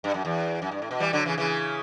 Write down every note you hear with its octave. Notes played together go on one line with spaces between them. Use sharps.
G2
F#2
E2
F#2
G2
A2
B2
E3 G3
D3 F#3
C#3 E3
C#3 E3